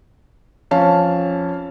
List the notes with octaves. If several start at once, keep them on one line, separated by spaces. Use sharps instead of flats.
F2 C#4 F5 A5